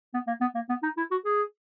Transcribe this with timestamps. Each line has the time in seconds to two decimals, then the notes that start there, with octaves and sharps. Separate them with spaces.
0.14 B3
0.27 A#3
0.41 B3
0.55 A#3
0.69 B3
0.83 D#4
0.97 E4
1.11 F#4
1.25 G#4